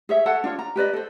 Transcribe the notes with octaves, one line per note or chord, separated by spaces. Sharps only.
G#4 C#5 E5
A4 C#5 F#5 A5
D4 F4 C#5
A#5
G4 B4 D5 D#5
A4 C5